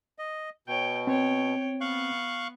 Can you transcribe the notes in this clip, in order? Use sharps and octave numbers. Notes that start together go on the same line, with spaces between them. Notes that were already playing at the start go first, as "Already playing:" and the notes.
D#5
B2 C#5 G5
C4 C#5 G5
B3 F5 C#6 F#6